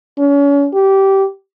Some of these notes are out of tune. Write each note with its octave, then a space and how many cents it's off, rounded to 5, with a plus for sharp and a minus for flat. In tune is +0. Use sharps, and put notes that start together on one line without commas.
C#4 +35
G4 -15